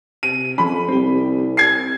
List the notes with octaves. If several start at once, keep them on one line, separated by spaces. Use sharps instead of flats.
C3 D#7
F2 F3 C#4 B5
C2 C4 G4
G#6 C7